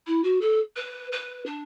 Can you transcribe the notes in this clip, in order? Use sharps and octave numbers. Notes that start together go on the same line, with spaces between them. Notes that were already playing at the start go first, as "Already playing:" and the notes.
E4
F#4
A4
B4
B4
D4